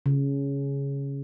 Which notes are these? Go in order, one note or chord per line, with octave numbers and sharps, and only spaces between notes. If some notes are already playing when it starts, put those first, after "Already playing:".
C#3